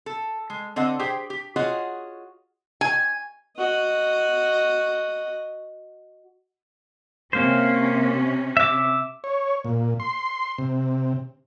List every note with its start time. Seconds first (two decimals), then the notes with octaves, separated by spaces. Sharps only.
0.06 A4
0.50 G#3
0.76 D3 C4 A4 D#5 F#5
0.99 G4 G#4 C5 G5
1.30 G4
1.56 F4 F#4 G#4 C#5 D#5 F#5
2.81 G#5
3.57 F#4 D#5
7.33 C3 A#3 C#4 C5
8.57 E5 D6
9.24 C#5
9.65 A#2
10.00 C6
10.58 C3